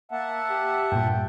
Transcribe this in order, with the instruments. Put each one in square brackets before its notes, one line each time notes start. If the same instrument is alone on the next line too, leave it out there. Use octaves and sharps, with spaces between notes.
[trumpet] A#3 [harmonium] E5 F#5 A5
[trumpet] G4
[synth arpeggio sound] G2 A#2 [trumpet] G5